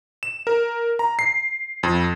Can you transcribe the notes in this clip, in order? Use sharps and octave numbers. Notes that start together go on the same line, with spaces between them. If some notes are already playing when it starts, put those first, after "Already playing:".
E7
A#4
A#5
C7
F2